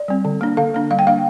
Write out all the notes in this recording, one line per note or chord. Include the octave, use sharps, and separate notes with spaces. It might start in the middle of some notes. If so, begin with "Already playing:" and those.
Already playing: D5
G3 C4
D3
A#3 D4
D3 F5
A#3 D4
G3 F5
G5
A#3 D4 F5